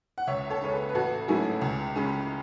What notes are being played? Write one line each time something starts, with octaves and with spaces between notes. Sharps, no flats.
F#5
C#2 C#5 E5
A4 C#5
C#3 G#3 C#4 C#5
G#4 B4
B4
A1 F#4 A4
G#2 F#3 A3 C#4 E4 G#4
C#2
C#3 G#3 C#4